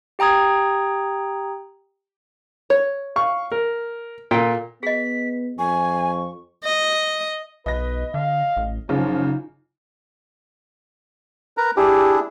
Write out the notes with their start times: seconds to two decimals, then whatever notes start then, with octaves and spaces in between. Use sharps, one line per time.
0.19 G4 G5 A#5 D#6 G#6
2.70 C#5
3.16 F5 C#6
3.52 A#4
4.31 A#2 A4 F#5 G5
4.83 B3 G#4 D#5 B6
5.58 F2 G#5 C#6
6.64 D#5
7.66 B1 B4 D#5 A#6
8.14 D3 F5
8.57 A1
8.89 F#1 C#3 F3 D#4 F4
11.57 A#4 B4 A#5
11.77 D4 E4 G4 G#4